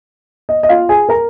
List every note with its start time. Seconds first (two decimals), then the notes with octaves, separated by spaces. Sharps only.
0.49 D#5
0.63 D#5
0.69 F4 F5
0.89 G#4 G#5
1.09 A#4 A#5